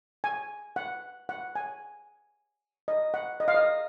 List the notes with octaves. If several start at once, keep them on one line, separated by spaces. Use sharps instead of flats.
G#5
F#5
F#5
G#5
D#5
F#5
D#5
F5
D#5